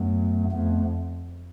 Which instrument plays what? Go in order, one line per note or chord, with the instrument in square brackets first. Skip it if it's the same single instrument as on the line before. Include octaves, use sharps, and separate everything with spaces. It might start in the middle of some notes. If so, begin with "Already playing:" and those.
Already playing: [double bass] F#2 [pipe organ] A3 B3
[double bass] F2 [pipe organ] A3 B3